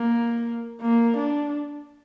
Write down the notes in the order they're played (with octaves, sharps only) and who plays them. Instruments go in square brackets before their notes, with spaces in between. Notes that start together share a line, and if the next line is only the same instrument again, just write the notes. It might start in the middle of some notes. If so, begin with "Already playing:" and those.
Already playing: [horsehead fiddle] A#3
A#3
D4